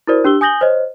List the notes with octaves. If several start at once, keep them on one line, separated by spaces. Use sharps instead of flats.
E4 F#4 A#4 C5 D5
D4 G4 E6 G7
G#5 D#6 G6 A#6 F#7 G7
C5 C#5 D#5